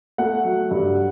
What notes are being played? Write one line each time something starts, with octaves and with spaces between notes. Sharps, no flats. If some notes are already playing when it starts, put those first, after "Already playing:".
A3 F#5
F#3
G2